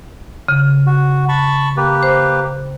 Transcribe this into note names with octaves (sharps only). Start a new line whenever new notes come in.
C#3
F#4
A5 B5 C#6
A#3 G4 B4
C5